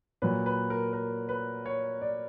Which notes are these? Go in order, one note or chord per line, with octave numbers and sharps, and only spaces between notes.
A#2 F#3 B4
B4
A#4
A#4
B4
C#5
D5